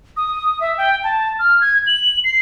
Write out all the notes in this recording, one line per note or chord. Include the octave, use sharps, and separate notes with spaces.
D#6
E5
G5
A5
F6
G#6
F#7
C7